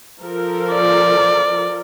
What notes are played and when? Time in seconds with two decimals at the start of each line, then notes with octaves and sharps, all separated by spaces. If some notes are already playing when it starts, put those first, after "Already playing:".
0.22 F3 A4 A#4
0.73 D5